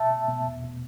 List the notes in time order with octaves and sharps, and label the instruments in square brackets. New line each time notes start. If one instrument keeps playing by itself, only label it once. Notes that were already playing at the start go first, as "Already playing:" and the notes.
Already playing: [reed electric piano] B2 E5 A5
B2
B2
E2
B2